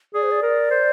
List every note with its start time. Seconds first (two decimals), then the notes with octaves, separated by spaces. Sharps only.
0.14 G#4 D5
0.23 C5
0.31 D5
0.42 A#4
0.70 C5